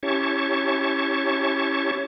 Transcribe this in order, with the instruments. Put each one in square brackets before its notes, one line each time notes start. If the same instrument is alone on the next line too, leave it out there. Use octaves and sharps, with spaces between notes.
[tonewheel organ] C#4 E4 G4 C#5 A5 C#6